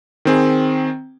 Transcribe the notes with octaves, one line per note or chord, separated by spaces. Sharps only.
D#3 C4 G#4